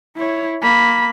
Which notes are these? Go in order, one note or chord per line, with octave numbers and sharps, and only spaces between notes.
E4 C#5
A#3 B5